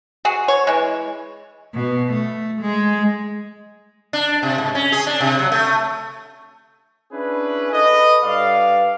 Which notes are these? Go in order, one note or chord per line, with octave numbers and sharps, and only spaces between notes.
F#4 G#4
C#5
E3 G#3
B2
A3
G#3
D4
C3
G#2
C#4
G#4
D4
C3
F#3
A3
C#4 D4 E4 G#4 B4
A4 B4 D#5
G2 B4 D5 F5